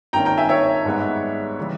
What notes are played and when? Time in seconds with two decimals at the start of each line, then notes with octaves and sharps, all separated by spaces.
0.13 G#1 G2 D#3 A#3 C#4 G5 A#5
0.25 G5 A#5
0.37 E5 G#5
0.49 C#5 E5
0.85 G#2 G3 B3
1.58 C#3 E3 G3